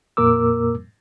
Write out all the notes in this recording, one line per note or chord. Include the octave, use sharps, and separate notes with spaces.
F2 A#2 A#3 A#4 D6 E6